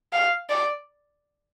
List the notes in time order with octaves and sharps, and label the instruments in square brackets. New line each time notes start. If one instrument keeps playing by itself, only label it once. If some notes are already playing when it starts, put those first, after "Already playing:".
[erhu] F5
D5